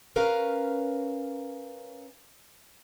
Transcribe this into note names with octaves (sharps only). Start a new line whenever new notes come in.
C#4 A#4 B4 C#5 F5 A#5